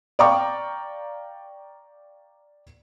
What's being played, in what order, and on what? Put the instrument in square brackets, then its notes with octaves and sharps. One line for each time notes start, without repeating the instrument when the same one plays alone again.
[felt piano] D5 F5 G5 A#5 C#6 D6